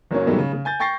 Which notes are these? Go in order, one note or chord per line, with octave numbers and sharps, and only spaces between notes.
F#1 F#3 A#3 C#4
G#2 B2 D#3 F#3 G3 A3
C#3
C#3
G#5 G6 A6
G5 C#6 G6 A6 A#6 C7